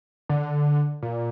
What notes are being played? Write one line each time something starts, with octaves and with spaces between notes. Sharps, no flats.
D3
A#2